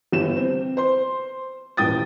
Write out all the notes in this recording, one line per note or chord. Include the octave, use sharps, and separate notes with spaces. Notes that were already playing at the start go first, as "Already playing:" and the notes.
G1 E2 G4 E7
C4
C5 C6
D#1 A1 G5 D#6 A6